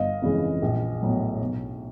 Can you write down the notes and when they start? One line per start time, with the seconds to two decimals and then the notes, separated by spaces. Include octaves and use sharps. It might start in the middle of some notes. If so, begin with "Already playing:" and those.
Already playing: G1 D#5 F5
0.22 F2 C#3 E3 G#3
0.62 A#1
1.02 A2 F#3 B3
1.41 B1